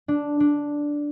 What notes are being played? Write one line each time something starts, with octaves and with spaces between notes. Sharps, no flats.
D4
D4